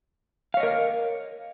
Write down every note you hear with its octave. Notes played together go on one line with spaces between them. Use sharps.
A#4 C#5 D#5 F5